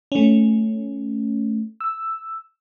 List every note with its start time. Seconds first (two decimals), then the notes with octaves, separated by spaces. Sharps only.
0.12 A3 C#4
1.80 E6